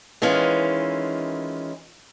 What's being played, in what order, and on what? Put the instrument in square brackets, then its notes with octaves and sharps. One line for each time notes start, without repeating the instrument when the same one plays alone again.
[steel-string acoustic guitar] D#3 E3 G#3 C#4 F4